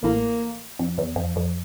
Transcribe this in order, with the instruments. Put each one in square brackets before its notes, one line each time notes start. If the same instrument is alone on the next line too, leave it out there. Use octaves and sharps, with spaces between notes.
[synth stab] A1 A2 [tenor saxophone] A#3
[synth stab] F2
E2
F2
F2